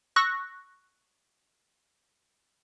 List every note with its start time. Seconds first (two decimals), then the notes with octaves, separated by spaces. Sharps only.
0.16 C#6 E6 F#6 A#6